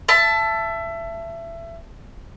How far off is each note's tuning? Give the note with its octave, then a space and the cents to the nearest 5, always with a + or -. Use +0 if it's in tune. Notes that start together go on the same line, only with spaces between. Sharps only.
E5 +25 A5 +0